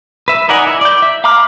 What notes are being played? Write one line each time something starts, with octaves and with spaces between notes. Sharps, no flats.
B4 E5
D#4 A#4 D5 F#5 G#5
E4
D5 G6
E5
F5 A#5 B5 D6 F6